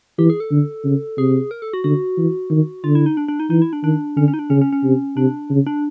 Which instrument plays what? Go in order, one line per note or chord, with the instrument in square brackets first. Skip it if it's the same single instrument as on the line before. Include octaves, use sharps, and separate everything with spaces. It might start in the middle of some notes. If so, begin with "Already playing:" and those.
[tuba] E3 [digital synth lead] G4
[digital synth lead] G#4
A4
[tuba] D3
C#3
[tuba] C3 [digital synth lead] G#4
[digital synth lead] A#4
A4
F#4
[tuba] D3 [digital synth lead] F#4
[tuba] E3
D#3
[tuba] D3 [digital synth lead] F4
[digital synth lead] E4
D#4
D4
D4
D#4
[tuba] E3 [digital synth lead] D#4
[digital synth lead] E4
D4
[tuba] D#3 [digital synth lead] D4
[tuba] D3 [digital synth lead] C#4
[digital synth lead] C#4
D#4
D4
[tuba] C#3 [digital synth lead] C#4
[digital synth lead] C#4
C#4
[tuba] C3
[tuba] C3 [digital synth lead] D4
[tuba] C#3
[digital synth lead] D4